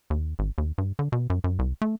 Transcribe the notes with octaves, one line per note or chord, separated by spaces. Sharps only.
D#2
G#1
D#2
G2
D3
B2
F#2
F#2
C2
A3